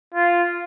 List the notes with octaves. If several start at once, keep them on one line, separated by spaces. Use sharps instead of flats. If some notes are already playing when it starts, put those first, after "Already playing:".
F4